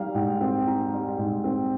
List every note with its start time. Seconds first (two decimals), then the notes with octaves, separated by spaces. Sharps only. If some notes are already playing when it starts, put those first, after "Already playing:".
Already playing: G3 D#4 F5
0.15 G#2 G5
0.41 C4
0.67 D#4
0.92 G3
1.18 G#2
1.44 C4